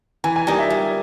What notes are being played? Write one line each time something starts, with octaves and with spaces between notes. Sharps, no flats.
E3 G#5
G#5
G3 A#3 D#4 G#5
E5
G3